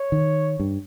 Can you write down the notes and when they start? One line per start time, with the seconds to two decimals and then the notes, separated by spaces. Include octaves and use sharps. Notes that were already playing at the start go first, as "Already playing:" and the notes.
Already playing: C#5
0.12 D#3
0.60 G2